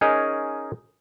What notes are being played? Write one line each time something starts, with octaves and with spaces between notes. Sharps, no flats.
C#4 D#4 G#4 A#4 C#5 D#5